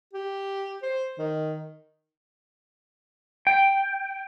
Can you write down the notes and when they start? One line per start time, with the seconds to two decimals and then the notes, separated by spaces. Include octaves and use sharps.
0.13 G4
0.82 C5
1.19 D#3
3.47 G5